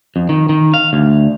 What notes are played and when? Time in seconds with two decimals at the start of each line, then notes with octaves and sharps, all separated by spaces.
0.16 F2
0.29 D#3
0.49 D#3
0.74 F5
0.93 D2